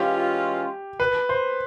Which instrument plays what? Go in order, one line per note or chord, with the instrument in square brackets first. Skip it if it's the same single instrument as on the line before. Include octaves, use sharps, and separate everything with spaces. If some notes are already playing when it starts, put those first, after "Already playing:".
Already playing: [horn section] E3 G#3 C#4 F4 [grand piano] G4
[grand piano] B4
C5